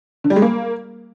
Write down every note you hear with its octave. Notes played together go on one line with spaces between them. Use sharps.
D3
G3
G#3
A#3